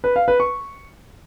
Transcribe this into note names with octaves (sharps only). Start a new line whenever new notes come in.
B4
F5
B4
C#6